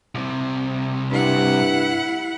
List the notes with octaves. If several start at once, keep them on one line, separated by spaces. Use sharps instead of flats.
C2 C3
G2 E4 F#5